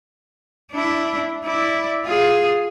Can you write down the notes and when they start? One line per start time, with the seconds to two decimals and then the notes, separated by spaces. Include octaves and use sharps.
0.72 D4 E4
1.44 E4 D5
2.05 F4 G#4